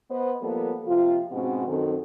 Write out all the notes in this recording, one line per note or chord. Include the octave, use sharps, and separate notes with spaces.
B3 B4 C5 D#5
F3 G3 A#3 B3 A4
C3 F3 F4
G#2 B2 C4 C#4 F#4
F#2 D#3 C4 F#4 A4